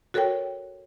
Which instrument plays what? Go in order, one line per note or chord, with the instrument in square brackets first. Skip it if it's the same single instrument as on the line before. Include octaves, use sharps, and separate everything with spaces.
[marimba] F#4 A4 A#4 C#5 G5